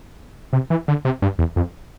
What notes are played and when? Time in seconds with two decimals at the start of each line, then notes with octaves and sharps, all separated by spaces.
0.53 C3
0.70 E3
0.88 D3
1.05 C3
1.22 G2
1.39 E2
1.56 F2